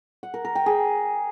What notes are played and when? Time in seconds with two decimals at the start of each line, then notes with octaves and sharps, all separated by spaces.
0.23 F#5
0.34 A#4
0.45 A#4
0.55 G5
0.66 G#4